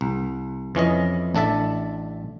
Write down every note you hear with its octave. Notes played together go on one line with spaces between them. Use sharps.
C2
F2 E3 C#4 D#5
A1 D4 A4 E5 A5